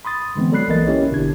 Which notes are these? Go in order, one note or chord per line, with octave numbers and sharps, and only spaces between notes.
B5 C6 D#6 A6
D3 E3 G#3 B3 C4
F#3 A4 D5 B5 F#6 C7
B1 E3 A#3 A#4 D#5 A6
C#4 E4 G4 C#5
G#1 B2 D3 D4 G#6